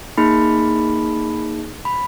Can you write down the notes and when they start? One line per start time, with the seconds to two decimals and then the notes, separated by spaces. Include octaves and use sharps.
0.18 A#3 D#4 G#4 B5
1.85 B5